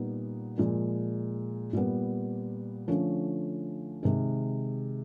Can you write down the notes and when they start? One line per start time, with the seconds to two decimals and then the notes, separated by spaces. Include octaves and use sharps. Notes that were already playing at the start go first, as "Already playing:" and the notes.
Already playing: A#2 G3 B3 D#4
0.58 A#2 F3 G#3
1.73 A#2 G3 B3
2.88 D3 F3 A3 C#4
4.03 C3 D#3 G#3